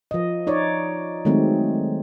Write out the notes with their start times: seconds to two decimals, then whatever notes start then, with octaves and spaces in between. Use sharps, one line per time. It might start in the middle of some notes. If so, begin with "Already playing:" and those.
0.11 F3 D#5
0.47 D#4 C#5 D5
1.25 D#3 F#3 G#3 A3 C4